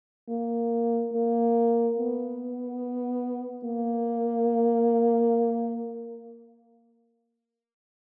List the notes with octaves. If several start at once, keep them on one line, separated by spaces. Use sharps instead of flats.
A#3
A#3
B3
A#3